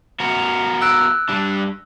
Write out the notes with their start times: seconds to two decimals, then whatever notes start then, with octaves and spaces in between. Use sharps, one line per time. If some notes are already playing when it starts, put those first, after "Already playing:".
0.20 B3 F#4 A#4
0.81 E6 F#6 D7
1.29 G3 D4